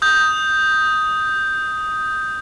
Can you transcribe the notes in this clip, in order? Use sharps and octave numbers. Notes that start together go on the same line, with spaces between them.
D#6 G6